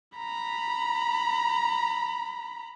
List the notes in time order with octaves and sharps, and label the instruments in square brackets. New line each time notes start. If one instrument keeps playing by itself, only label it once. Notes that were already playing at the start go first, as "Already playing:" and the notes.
[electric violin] A#5 B5